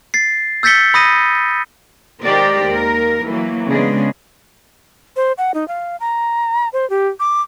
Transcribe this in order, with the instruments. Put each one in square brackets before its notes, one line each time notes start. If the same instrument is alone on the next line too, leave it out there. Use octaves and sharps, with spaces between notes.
[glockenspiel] A6 C7
E6 G6 A6 B6 C#7 G7
B5 D#6 A#6 D#7
[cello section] D#3 G#3 G4 A#4 C5 D5
D#2 A#4
E3 F#3 A#3
C#3 G#3 B3 D4 G#4
[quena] C5
F#5
D#4
F5
A#5
C5
G4
D6